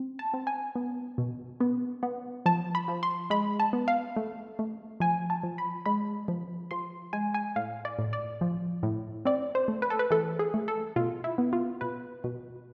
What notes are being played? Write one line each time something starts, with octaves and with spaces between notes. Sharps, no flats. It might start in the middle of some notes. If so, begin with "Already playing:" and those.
Already playing: C4
A5
C4
G#5
B3
B2
B3
B3
F3 A5
B5
F3
C6
G#3 B5
A5
B3
F5
A3
A3
F3 G#5
A5
F3
B5
G#3 B5
F3
F3 C6
G#3 G#5
G#5
A2 F5
D5
A2
D5
F3
A2
C4 D5
C5
A3
B4
A4
B4
E3 A4
G#4
A3
A4
B2 F4
E4
B3
F4
B2 B4
B2